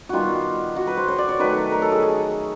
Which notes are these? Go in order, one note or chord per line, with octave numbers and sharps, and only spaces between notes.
D#3 G3 B3 F4 F#4
F#4
B4
C5
C#5
D5
C#5
D#3 F#3 A3 B4
A#4
A4
G#4
G#4